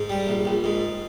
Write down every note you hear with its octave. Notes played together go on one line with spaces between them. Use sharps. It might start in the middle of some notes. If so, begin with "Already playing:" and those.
Already playing: G#2
G3
A#1
A#1
G#2